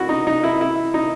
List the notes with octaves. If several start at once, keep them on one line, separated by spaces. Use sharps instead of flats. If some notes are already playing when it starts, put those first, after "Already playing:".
Already playing: E4 F#4
D#4
D#4
E4
E4
D#4